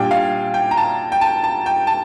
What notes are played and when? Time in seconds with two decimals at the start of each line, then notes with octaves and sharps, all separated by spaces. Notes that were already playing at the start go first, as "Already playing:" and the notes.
Already playing: A#2 G3 D4 G5
0.11 F5
0.54 G5
0.71 A#5
0.77 A5
1.12 G5
1.21 A5
1.44 A5
1.66 G5
1.87 A5